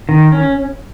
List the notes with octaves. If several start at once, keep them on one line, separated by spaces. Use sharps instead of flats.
D#3
C#4